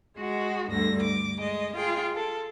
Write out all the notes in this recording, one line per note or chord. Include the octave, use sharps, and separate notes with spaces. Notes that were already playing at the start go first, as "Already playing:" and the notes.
G#3 F#4
D2 G2 D3 A#6
D6
G#3 D#5
F4 G#4 G5
A4